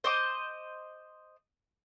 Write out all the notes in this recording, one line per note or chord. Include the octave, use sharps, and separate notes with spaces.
C5 D#5 D6